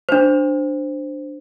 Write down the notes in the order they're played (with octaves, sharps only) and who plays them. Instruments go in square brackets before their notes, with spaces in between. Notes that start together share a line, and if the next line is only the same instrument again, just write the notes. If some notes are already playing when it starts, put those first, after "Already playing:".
[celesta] D4 C5